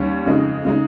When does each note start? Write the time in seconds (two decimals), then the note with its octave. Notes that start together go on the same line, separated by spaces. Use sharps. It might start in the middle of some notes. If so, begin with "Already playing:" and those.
Already playing: D#2 D#3 G3 C#4
0.26 F2 C#3 G#3 D#4
0.65 C#3 G#3 D#4